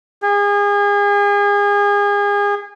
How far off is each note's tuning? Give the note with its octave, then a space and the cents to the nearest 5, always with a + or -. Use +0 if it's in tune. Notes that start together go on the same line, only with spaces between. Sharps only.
G#4 -35